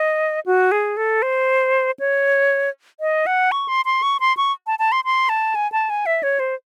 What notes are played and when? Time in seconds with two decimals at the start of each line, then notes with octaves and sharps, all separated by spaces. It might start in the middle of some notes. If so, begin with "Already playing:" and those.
Already playing: D#5
0.46 F#4
0.72 G#4
0.97 A4
1.22 C5
2.00 C#5
3.00 D#5
3.26 F#5
3.52 C#6
3.68 C6
3.85 C6
4.02 C#6
4.20 C6
4.37 C#6
4.67 A5
4.79 A5
4.92 C6
5.05 C6
5.29 A5
5.55 G#5
5.72 A5
5.90 G#5
6.06 E5
6.23 C#5
6.40 C5